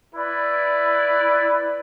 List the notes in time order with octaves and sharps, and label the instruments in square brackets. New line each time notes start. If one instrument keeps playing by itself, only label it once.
[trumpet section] E4 B4 D5